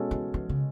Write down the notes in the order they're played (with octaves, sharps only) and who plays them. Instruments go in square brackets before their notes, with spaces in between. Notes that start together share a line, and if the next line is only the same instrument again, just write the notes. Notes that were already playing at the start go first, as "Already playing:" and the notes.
Already playing: [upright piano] B2 G#3 C#4 F#4 A4
[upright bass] E3
E3
C#3